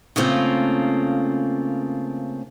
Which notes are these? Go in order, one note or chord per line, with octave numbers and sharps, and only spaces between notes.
C#3 A3 A#3 C4 F4